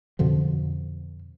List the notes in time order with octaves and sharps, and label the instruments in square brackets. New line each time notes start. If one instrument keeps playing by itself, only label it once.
[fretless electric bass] F2 B2 D3 F3